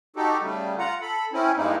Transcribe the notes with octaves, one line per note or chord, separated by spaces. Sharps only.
D#4 F#4 G4 A4
C#3 G3 A3
F4 F#5 A#5
A4 B5
C4 C#4 E4
G2 G3 G#3 A#3 D#4 E4